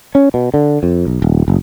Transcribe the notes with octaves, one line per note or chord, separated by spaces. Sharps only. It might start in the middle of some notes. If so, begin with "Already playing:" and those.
C#4
B2
D3
F2
B1
D#1
F#1